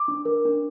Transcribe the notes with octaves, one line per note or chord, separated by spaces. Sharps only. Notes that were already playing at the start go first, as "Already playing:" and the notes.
Already playing: D6
D4
A#4
D4